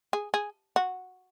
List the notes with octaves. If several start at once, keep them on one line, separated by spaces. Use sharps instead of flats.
G#4
G#4
F#4